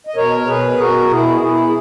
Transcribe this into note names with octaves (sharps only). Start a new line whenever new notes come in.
D#5
B2 A#4 C#5
B2 G#4 B4
B2 F#4 A#4
B2 E4 G#4
B2 E4 G#4